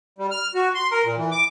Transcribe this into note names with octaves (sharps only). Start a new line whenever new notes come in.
G3
F6
F#4
C6
A#4
A#2
E3
D6